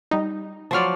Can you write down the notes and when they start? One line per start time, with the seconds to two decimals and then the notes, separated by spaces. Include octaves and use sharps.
0.11 G3 D#4
0.71 F3 F#3 D5 A5 C6 F6